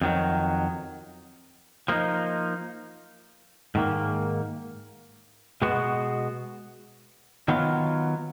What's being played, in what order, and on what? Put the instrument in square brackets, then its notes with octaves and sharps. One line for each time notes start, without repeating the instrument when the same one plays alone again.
[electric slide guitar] F2 D#3 F#3
F3 A#3 D#4
G#2 D#3 A#3
B2 G#3 B3 F#4
D#3 F#3 B3 F4